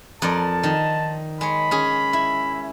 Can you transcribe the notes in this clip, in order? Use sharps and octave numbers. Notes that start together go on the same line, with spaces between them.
F2 A#4 D5 A5
D#3
G#3 C#5 B5
C#4 G#4
E4